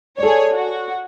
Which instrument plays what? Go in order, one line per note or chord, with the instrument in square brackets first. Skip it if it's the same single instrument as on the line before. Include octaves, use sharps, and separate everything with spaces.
[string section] G#4 C#5 [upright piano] A4 D5
[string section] F#4